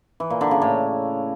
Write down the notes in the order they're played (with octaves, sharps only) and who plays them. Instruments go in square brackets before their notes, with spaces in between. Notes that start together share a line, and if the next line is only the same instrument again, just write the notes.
[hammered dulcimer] E3
A#2
D3
C#3
A2